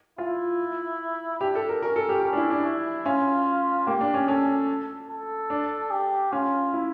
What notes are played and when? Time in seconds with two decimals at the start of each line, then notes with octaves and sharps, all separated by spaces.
0.18 E4 F4
1.41 D4 G4
1.55 A4
1.69 A#4
1.82 C#4 A#4
1.96 A4
2.09 G4
2.23 C#4 G4
2.33 D4
2.37 E4
2.50 D4
2.64 E4
3.05 C#4 F4
3.87 A#3 G4
4.01 D4
4.14 C#4
4.28 C#4 A4
5.09 A4
5.50 D4
5.91 G4
6.32 C#4 F4
6.73 E4